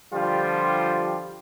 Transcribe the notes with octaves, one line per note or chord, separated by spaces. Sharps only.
D3 F3 G3 F4 G4